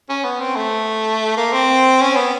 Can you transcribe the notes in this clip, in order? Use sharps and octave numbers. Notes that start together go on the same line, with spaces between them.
C#4
B3
C4
A3
A#3
C4
C#4
B3